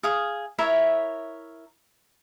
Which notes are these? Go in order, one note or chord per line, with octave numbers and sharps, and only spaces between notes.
G#4 F5 D#6
E4 A#4 C#5 E5